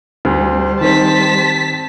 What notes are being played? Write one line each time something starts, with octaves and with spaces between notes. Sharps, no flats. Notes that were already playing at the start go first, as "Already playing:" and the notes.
D2 G3 C5
D#3 C4 A5 B6